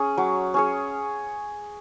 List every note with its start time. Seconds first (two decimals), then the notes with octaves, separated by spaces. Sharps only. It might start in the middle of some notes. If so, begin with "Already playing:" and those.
Already playing: C#4 G#4
0.17 F#3
0.54 C#4 G#4 C#5